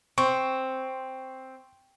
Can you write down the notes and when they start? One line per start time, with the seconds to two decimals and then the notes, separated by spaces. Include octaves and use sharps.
0.18 C4 C#6